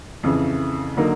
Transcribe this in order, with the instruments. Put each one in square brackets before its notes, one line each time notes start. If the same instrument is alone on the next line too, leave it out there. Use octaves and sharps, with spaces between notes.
[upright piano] F2 C#3 E3
D3 F#3 A#3 D#4